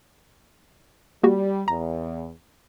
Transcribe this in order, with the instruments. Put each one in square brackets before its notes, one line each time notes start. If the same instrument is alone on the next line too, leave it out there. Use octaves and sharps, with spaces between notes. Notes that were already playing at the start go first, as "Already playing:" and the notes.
[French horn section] G3 [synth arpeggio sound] A#3 F#4 G4
[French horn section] E2 [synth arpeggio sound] A#5